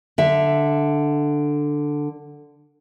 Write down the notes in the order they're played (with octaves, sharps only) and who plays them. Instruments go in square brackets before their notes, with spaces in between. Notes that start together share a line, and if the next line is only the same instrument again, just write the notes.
[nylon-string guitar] D3 E5